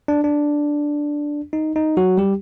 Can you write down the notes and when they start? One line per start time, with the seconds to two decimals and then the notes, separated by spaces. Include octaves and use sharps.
0.08 D4
0.24 D4
1.53 D#4
1.76 D#4
1.97 F#3 F#4
2.18 G3 G4